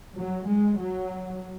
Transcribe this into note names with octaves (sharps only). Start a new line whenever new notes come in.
F#3
G#3
F#3